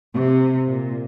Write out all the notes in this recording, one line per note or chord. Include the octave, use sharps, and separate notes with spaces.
C3
A#2